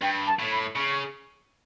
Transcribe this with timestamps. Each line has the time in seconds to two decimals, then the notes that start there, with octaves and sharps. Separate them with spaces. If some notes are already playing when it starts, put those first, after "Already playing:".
0.02 G2 G5
0.27 A5
0.39 A2
0.51 B5
0.76 C#3 C#6